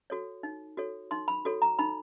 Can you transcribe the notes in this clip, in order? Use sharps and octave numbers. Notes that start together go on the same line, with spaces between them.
F#4 A4 C#5
D#4
F#4 A4 C#5
D#4 C6
B5
F#4 A4 C#5
A#5
D#4 B5